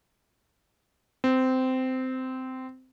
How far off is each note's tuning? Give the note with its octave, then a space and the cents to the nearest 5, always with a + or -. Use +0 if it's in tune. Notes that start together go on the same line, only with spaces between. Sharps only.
C4 -15